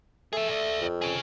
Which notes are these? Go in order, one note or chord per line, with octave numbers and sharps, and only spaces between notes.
A3 G#4 E5
D5 E5
F2
C#4 G#4